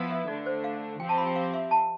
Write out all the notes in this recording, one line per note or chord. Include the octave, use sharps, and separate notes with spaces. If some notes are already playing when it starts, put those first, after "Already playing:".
Already playing: F3 B3 E4 B4
E5
D3 A3 D4 D5
C5
F5
F3 C4 G4 C5 G5
A5
B5
G5
F5
E5
A5